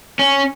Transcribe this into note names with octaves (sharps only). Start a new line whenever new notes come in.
C#4